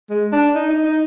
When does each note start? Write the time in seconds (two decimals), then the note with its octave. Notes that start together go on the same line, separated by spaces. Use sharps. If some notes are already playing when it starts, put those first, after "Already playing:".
0.10 G#3
0.32 D4
0.55 D#4
0.70 D#4
0.85 D#4